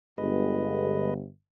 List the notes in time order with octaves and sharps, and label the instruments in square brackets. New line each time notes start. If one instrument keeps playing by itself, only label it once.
[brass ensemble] G1 [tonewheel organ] G#3 B4 D#5